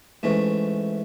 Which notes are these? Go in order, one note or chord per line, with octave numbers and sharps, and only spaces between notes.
G#2 E3 A3 C#4